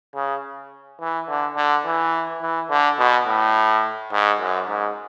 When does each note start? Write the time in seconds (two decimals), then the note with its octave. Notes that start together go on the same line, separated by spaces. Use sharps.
0.15 C#3
1.01 E3
1.28 D3
1.56 D3
1.86 E3
2.42 E3
2.70 D3
2.99 B2
3.27 A2
4.12 G#2
4.41 F#2
4.69 G#2